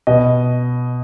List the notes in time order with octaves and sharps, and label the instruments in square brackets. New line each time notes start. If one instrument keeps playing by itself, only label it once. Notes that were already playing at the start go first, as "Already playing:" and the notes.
[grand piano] B2 D#5